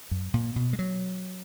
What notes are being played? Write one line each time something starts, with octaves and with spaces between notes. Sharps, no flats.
F#2
A#2
B2
G#3
F#3